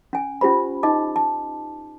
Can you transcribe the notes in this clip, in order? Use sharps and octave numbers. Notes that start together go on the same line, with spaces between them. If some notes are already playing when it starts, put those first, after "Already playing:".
C#4 G#5
C#4 F4 G4 C5 B5
D#4 D#5 A5 D6
A5